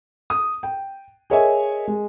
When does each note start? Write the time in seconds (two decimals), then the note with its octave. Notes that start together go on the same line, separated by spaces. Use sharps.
0.30 D#6
0.63 G5
1.30 G#4 A#4 C#5 D#5 E5 G#5
1.87 G#3